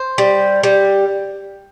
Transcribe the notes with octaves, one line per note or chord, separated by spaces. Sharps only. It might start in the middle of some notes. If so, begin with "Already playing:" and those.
Already playing: C5
G3
G3